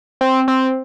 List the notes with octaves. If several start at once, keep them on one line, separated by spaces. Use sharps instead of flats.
C4
C4